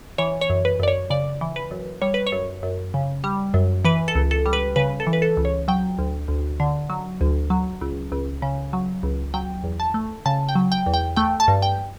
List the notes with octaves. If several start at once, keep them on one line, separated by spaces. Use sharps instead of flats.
E3 C#5
C#5
F#2
B4
F#2 D5
C#5
C#3 D5
E3
B4
F#2
G3 C#5
B4
C#5
F#2
F#2
C#3
G3
F#2
E3 B4
A4
C#2
A4
G3
B4
C#3 B4
A4
E3
B4
A4
C#2
C#5
F#3 G5
D2
D2
D3
F#3
D2
F#3
C#2
C#2
C#3
F#3
C#2
F#3 G5
E2
A5
A3
C#3 A5
G5
F#3
G5
E2
G5
A3 G5
A5
G2
G5